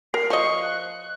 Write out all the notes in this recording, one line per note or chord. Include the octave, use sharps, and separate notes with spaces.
A#4 C7
F3 D#5 C#6
F#6